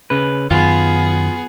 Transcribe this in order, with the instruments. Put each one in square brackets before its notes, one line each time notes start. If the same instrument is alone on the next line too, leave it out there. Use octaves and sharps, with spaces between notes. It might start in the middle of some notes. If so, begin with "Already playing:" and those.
[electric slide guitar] C#3 B4
[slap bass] F#2 D#3 F#3 [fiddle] B3 G#4 [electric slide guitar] F4